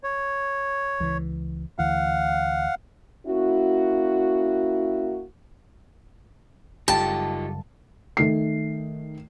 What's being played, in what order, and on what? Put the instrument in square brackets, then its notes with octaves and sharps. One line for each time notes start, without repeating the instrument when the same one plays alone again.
[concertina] C#5
[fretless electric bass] C#2 E3
[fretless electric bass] D2 D3 E3 [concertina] F5 F#5
[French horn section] A#3 C#4 E4 F#4
[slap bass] F#1 G3 [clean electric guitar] D#4 F4 A4 [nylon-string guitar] G4 [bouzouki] A5
[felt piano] D#3 A3 C7